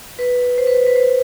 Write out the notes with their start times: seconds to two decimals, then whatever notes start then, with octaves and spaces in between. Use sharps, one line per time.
0.19 B4
0.58 C5
0.67 B4
0.87 B4
0.96 C5